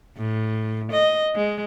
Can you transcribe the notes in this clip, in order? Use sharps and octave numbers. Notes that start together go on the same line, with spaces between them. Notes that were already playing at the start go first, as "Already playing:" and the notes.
A2
D#5
G#3